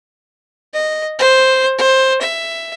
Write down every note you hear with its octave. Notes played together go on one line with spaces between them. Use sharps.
D#5
C5
C5
E5